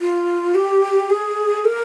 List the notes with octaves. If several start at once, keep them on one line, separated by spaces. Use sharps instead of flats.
F4
G4
G#4
A#4